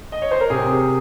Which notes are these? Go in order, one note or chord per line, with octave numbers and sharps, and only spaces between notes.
D#5
C#5
C5
A#4
C3 G#4